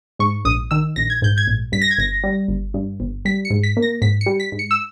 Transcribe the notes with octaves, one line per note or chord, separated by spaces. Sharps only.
G#2 C#6
A#1 D#6
D#3 E6
A#1 A#6
G#6
G#2 G6
G#6
A#1
G2 B6
A#6
G#6
G1 A#6
G3
G1
G2
G1
G3 B6
C#7
G#2
B6
A#3
A#6
G#2 B6
C#7
G3
B6
G#2
C#7
E6